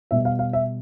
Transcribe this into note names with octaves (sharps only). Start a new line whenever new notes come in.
B2 G3 B3 E5
F5
F5
E5